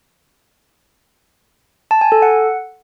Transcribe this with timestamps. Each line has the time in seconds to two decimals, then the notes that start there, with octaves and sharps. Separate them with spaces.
1.91 A5
2.01 G#5
2.12 A4
2.22 F#5